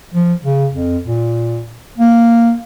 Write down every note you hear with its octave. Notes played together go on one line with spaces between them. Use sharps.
F3
C#3
F2
A#2
A#3